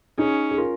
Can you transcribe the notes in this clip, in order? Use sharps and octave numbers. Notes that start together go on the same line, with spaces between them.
C#4 D#4 G#4
G#4
F4 A#4